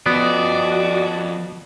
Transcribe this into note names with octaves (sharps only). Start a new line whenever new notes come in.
F3 B3 F#4 D5 D#5